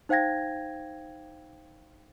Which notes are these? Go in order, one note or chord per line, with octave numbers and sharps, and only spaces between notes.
D#4 C5 F5 G5 G#6 A#6